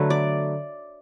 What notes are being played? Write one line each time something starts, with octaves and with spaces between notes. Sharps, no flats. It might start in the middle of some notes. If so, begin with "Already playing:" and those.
Already playing: D3 F#3 A3 B4
D5